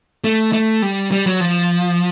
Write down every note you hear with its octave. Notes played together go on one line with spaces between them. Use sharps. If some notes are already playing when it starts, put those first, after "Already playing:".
A3
A3
G3
G3
F#3
F3